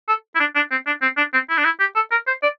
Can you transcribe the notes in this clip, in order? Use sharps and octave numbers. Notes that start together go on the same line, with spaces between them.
A4
E4
D4
D4
C4
D4
C4
D4
C4
E4
D4
E4
G4
A4
A#4
C5
D5